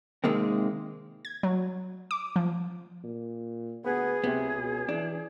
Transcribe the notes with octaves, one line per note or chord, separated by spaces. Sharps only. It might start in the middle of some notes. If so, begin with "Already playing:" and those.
C3 D#3 G#3 A#3 C4
G#6
F#3
D6
F3
A#2
D2 B3 G#4
C#2 C3 B3
B2
E3 D4